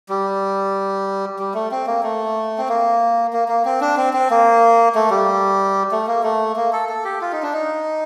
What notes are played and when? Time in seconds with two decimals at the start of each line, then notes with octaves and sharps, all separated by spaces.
0.09 G3
1.39 G3
1.54 A3
1.71 C4
1.86 A#3
2.03 A3
2.58 C4
2.68 A#3
3.33 A#3
3.48 A#3
3.65 C4
3.81 D4
3.97 C4
4.14 C4
4.30 A#3
4.95 A3
5.10 G3
5.91 A3
6.07 A#3
6.23 A3
6.56 A#3
6.73 A4
6.89 A4
7.05 G4
7.21 F4
7.32 D#4
7.43 D4
7.53 D#4